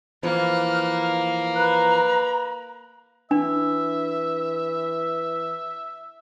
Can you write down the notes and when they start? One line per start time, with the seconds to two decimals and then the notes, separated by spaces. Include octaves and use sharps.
0.23 E3 F3 A#3 F6 F#6
1.56 B4 A#5
3.31 E3 D4 E5